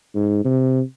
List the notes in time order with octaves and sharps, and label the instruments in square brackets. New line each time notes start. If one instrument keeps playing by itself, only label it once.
[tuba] G#2
C3